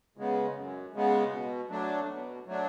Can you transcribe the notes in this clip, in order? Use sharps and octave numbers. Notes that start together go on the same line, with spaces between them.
C#3 G#3 B3
F#2
C#3 G#3 B3
B2
F#3 A3 D4
B2
F#3 A3 D4